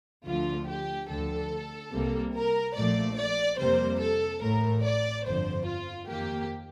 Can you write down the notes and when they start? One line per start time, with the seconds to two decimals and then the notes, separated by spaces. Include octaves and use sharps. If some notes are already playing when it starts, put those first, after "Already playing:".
0.26 D2 D3 F3 A3 F4
0.68 G4
1.09 D2 D3 F3 A4
1.93 C2 C3 G3 A#3
2.34 A#4
2.76 A#1 A#2 F3 A3 D5
3.17 D5
3.58 F2 C3 G3 A#3 C5
4.00 A4
4.42 A1 A2 A3 A#4
4.83 D5
5.25 G1 F2 D3 C5
5.67 F4
6.08 F2 D#3 A#3 G4